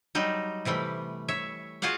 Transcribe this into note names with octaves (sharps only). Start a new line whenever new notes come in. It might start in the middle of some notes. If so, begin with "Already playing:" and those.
F#3 G3 D#4
C3 E3 G3 A3
C#5 E5
F4 F#4 G#4 F5 F#5